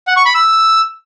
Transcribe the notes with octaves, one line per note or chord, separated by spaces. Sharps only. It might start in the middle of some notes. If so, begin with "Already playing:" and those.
F#5
C#6
B5
E6